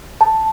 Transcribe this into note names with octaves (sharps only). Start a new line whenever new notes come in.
A5